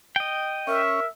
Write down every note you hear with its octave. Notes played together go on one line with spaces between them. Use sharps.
D#5 G5
C#4 A#4 E5